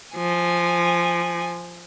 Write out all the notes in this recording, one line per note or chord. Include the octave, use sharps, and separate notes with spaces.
F3 G#5